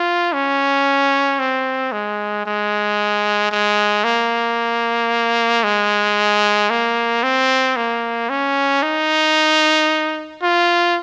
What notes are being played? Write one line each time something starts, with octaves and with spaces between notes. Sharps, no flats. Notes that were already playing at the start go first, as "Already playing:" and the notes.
Already playing: F4
C#4
C4
G#3
G#3
G#3
A#3
G#3
A#3
C4
A#3
C#4
D#4
F4